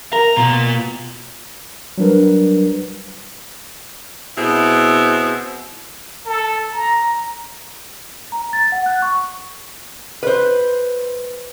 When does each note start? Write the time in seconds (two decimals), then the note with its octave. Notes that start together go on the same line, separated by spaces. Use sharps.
0.13 A#4 A#5
0.37 B2 A#3 F4
1.98 F#3 G3 D4 A#4 B4
4.36 B2 C4 E4 G#4
6.26 A4
6.73 A#5
8.32 A#5
8.53 A6
8.72 F#5
8.86 F#6
9.02 C#6
10.23 B4 C5